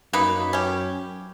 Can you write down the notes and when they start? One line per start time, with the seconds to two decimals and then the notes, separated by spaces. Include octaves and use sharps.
0.13 F#2 A#3 D#4 B4
0.53 C#4 G4